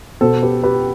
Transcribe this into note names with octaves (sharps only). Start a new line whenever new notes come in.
B2 A4 C5
G4 B4
G4 B4